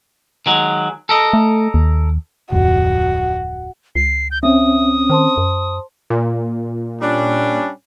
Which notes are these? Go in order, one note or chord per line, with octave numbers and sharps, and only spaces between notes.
D#3 F#3 G#3
A4 A#4 D#5
A3
D#2
D1 F2 F3 F#4
C#2 C7
G6
C4 C#4 E5 D#6
D#3 C5 A5 C6
F#2
A#2
G3 C#4 D4